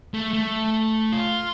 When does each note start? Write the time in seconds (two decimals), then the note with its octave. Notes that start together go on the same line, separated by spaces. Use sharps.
0.14 A3
0.33 A3
1.12 F4